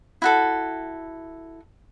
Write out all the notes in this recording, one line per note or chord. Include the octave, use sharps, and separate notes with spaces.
E4 F#4 A4